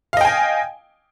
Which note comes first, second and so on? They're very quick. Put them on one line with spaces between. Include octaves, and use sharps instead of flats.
F5 D#5 G5 G#5